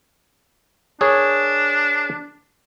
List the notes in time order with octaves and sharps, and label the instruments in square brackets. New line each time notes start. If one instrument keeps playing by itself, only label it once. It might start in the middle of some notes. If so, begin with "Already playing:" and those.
[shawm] D4 [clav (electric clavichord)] G#4 A#4 C#5